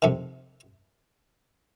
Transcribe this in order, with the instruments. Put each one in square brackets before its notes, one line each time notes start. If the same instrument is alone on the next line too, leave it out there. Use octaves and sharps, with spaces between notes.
[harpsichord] F2 C3 D#3